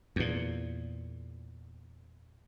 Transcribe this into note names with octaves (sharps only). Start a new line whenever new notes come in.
E2 A#2